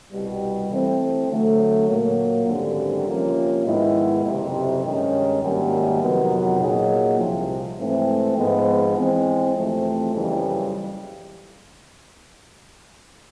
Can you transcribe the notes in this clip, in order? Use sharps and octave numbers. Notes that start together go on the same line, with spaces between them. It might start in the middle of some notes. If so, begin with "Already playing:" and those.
C2 B2 G3
E3 A3 C4
D3 F#3 A3
A#2 F#3 A#3
G#1 F#2 D3 G3 C4
C3 F3 A#3 C#4 F4
G#2 D#3 G#3 B3 E4
F#1 F2 C3
G2 D#3 G#3 C#4
G#1 F#2 D#3 G3 A#3
F2 C3 D#3 F#3 B3
A#2 F#3 A#3 D#4 G#4
C2 C3 F3
G#2 E3 A3 C4
G#2 F3 G#3 B3
E3 G#3 C4
E2 C3 F3 A3 C4
F#1 F2 C#3 E3 G3